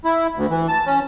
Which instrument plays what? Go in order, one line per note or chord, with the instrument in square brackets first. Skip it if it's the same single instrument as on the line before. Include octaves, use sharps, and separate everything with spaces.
[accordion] E4
D2
E3
A5
C#4